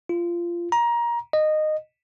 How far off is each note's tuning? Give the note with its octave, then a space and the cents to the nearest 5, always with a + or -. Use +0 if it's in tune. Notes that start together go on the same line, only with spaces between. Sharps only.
F4 -20
A#5 +20
D#5 -15